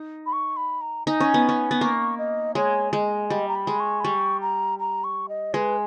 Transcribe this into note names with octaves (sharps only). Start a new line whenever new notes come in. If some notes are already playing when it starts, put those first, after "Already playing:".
Already playing: D#4
B5
C#6
B5
A#5
D#4 G#5
C#4
B3
C#4
B3
A#3 C#6
D#5
G#3 C#5
G#3 D#5
G3 D#5
A#5
B5
G#3
C#6
B5
G3 C#6
A#5
A#5
C#6
D#5
G#3 B4